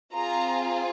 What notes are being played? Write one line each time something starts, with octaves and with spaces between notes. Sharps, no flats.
C4 F4 G#4 A#5